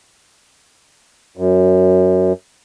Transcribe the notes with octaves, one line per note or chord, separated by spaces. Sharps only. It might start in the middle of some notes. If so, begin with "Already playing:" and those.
F#2